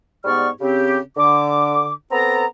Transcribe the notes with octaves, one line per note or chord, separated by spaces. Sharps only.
G#2 G3 B3 D5 C#6 F6
C#3 C4 G4
D3 D6
B3 C4 A4 A#5